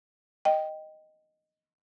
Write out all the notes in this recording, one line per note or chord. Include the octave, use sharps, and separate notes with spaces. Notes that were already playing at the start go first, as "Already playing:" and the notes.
D#5 G5